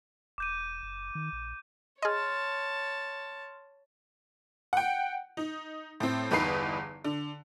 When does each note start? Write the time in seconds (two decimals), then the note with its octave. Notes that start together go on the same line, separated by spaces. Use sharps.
0.38 E1 D6 G6 D#7
0.83 F#1
1.15 D#3
1.33 A#1
2.02 G#4 C#5 D#5 A5 C6 F6
4.73 F#5 G5
5.37 D#4
6.00 A2 C4
6.31 G1 E2 D#4 B4 C7
7.05 D3